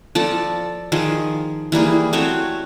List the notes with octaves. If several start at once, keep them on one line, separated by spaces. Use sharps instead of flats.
F3 A4 D5
D#3 F3 G#4
E3 G3 A#3 G#4
A3 C4 F#4 C#5